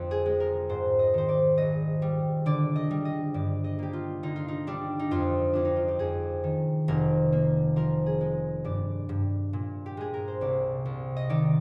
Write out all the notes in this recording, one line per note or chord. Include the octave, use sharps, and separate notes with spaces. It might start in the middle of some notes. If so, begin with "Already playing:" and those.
Already playing: F2 D3 F3 F4
G#4
G#3
A#4
G#2 C5
D#5
D#3 C5
D5
A#1 D#5
G3
D3 D5
D#5
G3
D#5
G2 D5
D#5
A#3 G4
F4
D3 D#4
F4
D#4
G3 D4
D#4
F2 F4
F2 D4
D#4
F4
G4
F2 G#4
D#3
F1 A#4
A#3
F3 A#4
G#4
G#3
G2 D5
G2
A#2
G4
G#3 G#4
A#4
C5
C2 D5
C2
D#5
D#3 D5